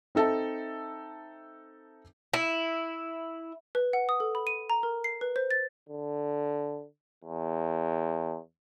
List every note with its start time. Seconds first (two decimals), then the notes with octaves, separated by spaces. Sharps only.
0.15 C4 D#4 A4 E5 A5
2.34 E4
3.75 B4
3.93 F#5
4.09 D#6
4.20 A4
4.35 B5
4.47 D#7
4.70 A#5
4.83 A#4
5.04 C7
5.21 B4
5.36 C5
5.51 A6
5.89 D3
7.24 E2